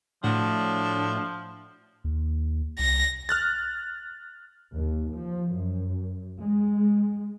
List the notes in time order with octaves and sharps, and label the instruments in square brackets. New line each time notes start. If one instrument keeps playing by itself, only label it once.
[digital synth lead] A2 [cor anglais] F3 [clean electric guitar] A3 F#4 F#5 [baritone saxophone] D4
[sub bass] D#2
[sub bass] C2 [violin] A#6
[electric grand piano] F6 F#6 A6
[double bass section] D#2
F3
F#2
G#3